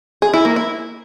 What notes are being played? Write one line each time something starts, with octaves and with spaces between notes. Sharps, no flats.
G#4
E4
A#3
E4